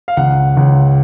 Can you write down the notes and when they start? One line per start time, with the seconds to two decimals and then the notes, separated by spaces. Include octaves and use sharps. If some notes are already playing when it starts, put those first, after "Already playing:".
0.08 F5
0.17 C#2 F#5
0.57 C#2